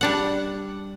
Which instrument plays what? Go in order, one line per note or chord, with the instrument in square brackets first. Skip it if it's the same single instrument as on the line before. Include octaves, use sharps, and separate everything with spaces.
[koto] G3 D4 F#5